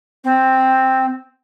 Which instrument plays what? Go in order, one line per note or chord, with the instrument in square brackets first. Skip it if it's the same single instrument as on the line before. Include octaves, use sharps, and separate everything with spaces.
[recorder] C4